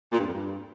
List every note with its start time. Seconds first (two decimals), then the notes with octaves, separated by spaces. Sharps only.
0.13 A#2
0.19 G2
0.26 F2
0.33 G2